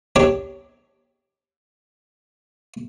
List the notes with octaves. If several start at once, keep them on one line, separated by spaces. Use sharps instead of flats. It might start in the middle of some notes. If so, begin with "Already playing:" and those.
D4 G4 C#5